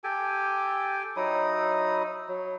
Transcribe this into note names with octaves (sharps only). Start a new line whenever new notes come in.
G4 A4 G5 G#5
F#3 D#4 E4 D#6
F#3